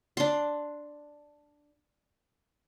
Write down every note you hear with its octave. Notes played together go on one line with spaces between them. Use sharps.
D4 C6